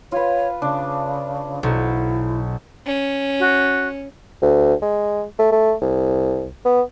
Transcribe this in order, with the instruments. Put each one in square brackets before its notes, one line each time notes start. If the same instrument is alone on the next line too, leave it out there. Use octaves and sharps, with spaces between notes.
[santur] F4 B4 [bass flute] C#5
[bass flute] C#3 [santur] D4
[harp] B1 [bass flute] E4 [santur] C5 C#6
[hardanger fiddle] C#4
[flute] F#4
[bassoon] D2
G#3
A3
A3
C2
B3